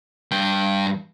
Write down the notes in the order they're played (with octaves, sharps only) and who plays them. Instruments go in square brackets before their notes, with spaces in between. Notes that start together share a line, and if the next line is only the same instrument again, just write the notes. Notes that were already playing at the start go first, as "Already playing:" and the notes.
[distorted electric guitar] G2 G5